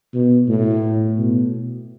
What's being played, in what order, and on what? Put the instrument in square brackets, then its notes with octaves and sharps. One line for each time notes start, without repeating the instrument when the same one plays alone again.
[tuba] B2
A2
B2